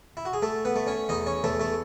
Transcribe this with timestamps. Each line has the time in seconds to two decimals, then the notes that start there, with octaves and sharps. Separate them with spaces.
0.17 E4
0.25 F#4
0.33 G#4
0.42 A3 A4
0.65 B3 B4
0.76 A3
0.87 C#4 C#5
1.09 E2 D#4 D#5
1.26 C#4 C#5
1.44 E2 A3 A4
1.60 A3 A4